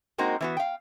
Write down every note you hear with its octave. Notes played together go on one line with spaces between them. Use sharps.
G#3 A#3 C4 D#4 F#4
E3 B3 F#4
F5 G5